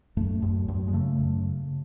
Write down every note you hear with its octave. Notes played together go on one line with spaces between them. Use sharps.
F#2 A3
F#2
F#2
G#3
C#3 A3
F#2
C#3